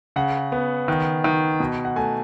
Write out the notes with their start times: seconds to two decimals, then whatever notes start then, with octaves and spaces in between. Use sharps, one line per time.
0.16 C#3 F#5
0.52 B3
0.88 D#3
1.24 D#3
1.60 B2
1.85 F#5
1.96 A3 G#5